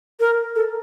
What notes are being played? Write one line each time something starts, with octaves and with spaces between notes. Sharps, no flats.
A#4
A4